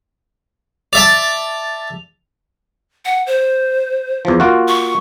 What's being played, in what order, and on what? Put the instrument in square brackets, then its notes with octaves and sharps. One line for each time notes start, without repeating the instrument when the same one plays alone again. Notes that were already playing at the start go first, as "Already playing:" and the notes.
[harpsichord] D5 E5 A5 [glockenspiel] F7
[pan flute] F#5
C5
[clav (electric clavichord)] E2 F3
A#3 F4 F#4
[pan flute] C#6